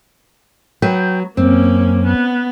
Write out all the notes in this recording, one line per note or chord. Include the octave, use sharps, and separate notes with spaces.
F#3 B3 B4 G5
F#2 A#3 C4 C#4
B3